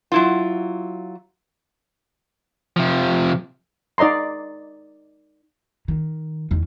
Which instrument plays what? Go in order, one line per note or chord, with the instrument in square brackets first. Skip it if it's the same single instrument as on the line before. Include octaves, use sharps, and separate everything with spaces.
[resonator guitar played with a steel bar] F#3 E4 F4
[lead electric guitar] C3 F3
[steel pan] D#4 D5 D#5 A#5 C6
[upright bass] D#3
E2 D#3